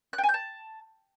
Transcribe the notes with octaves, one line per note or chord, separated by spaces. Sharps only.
F#6
G5
G#5
G6
A5